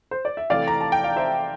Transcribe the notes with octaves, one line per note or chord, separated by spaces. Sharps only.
C5
D5
E5
C3 E3 A3 D5 F5
A#5
A5
G5
F5
C5 E5